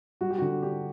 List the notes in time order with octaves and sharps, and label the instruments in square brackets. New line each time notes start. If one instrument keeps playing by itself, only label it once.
[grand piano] G3 [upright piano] F#4
[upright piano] G4
[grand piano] D3 [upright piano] F#4
[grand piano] D4 [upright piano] G4